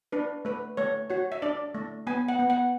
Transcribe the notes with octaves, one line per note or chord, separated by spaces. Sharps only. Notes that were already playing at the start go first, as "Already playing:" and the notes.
D4 B4
A3 B4
A3 C#5
F#4 C#5
E5
D4 D5
A3
B3 G#5
F#5
B3
F#5